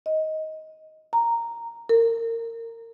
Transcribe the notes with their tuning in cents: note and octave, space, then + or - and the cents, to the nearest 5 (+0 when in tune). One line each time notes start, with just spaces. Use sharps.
D#5 +15
A#5 -5
A#4 -25